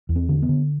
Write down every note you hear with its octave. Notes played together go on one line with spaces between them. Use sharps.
E2
C4
D3
B3
D3